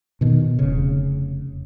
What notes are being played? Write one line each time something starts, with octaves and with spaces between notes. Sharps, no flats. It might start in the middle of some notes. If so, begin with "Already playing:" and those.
B2 D#3
F1 C#3